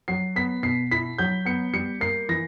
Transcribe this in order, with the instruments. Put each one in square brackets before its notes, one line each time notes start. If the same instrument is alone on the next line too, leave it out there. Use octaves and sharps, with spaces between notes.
[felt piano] F#3 [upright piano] C7
[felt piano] B3 [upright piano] B6
[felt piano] B2 [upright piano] C7
[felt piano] E4 [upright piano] B6
[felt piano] F#3 [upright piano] G6
[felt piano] B3 [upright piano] C#7
[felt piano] G3 [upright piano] C#7
[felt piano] A#3 [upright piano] C7
[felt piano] E3 [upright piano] A#6